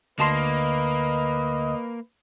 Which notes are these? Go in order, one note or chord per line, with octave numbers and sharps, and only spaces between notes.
D2 A#3 B4 D#5 A5 C6